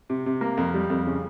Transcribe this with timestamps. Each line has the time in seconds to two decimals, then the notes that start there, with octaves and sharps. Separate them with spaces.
0.10 C3
0.26 C3
0.41 A#3
0.57 F2
0.74 G3
0.90 F2
1.07 C#3